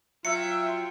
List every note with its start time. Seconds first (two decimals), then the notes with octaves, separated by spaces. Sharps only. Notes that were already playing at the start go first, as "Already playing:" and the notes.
0.25 F#3 F4 E5 G5 C#7